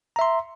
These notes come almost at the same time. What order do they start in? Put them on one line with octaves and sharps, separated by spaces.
A#5 E5 C6